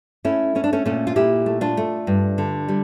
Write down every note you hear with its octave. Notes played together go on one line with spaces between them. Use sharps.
A3 C#4 E4
A3 C#4
D4
A3 C#4
A#2 A3 C#4
F4
A#2 E4 G4
A3
D4 F4
A3
G2
D3
G3